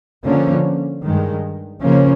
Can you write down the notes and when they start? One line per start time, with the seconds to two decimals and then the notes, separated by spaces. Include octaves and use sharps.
0.24 D3 F3 A#3 C#4
1.03 G2 D#3 G#3
1.82 C#3 F3 A#3 C#4